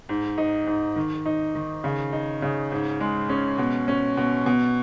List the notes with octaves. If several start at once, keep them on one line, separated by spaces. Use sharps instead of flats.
G#2
D#4
G#2
D#3
D#4
D#3
C#3
D#4
C#3
G#2
G#3
C#4
B2
C#4
B2
B2